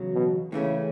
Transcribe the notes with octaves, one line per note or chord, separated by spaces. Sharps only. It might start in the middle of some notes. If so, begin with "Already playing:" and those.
Already playing: E2 C#3 F#3
B2
A2 C#3 E3 A3 C#4